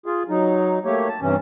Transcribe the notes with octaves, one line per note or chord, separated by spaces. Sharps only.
F4 G#4
F#3 D#4
A3 A#3 G4 C#5
A5
G2 C3 E3 C#4